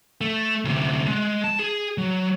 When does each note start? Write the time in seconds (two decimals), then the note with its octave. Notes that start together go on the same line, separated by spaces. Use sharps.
0.21 A3
0.65 D2 C3
1.08 G#3
1.44 A5
1.59 G#4
1.98 F#3